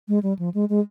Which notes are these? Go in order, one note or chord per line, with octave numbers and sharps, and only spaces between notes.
G#3
G3
F3
G#3
G#3